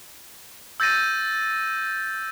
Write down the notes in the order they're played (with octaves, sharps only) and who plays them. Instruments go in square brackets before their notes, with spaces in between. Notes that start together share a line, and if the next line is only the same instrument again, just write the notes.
[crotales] E6 G6 A6 A#6 D#7